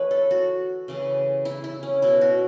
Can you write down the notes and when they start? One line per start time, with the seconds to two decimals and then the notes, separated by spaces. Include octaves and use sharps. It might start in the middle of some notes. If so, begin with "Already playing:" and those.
Already playing: E3 A3 B4 C#5
0.11 A4
0.31 F#4
0.88 C#3 E3 A3
1.45 E4
1.64 E4
1.83 C#4
2.02 B2 B3 E4
2.21 F#4